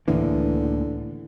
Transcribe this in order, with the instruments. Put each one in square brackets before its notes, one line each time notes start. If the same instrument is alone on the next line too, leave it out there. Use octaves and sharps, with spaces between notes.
[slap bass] C#2 A2 A#3 [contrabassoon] D3 [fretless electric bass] E3